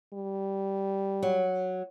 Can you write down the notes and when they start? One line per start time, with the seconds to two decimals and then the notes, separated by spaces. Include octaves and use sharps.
0.13 G3
1.23 F#3